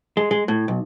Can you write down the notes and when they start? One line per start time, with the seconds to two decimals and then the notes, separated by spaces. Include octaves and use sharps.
0.17 G#3
0.31 G#3
0.48 A2
0.68 B1